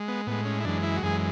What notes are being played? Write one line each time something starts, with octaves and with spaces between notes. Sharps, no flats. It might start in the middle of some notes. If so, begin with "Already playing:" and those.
Already playing: G#3
B3
A2 G#3 B3
C#4
E4
F#2 E3 G#3 D4
E4
F#4
F#2 E3 G#3 G#4